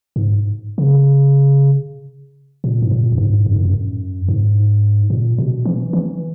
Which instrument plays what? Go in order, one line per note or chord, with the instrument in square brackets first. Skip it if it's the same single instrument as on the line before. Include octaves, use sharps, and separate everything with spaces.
[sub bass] G#2
C#3
A#2
G#2
A#2
F#2
G#2
F#2
G#2
F#2
G#2
A#2
B2
E3
E3